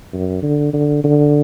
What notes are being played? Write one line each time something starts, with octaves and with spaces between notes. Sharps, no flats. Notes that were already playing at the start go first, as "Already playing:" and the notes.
F#2
D3
D3
D3